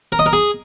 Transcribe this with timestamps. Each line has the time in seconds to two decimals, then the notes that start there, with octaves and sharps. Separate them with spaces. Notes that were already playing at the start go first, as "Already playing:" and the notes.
0.12 A#4
0.19 D#5
0.26 A#4
0.33 G#4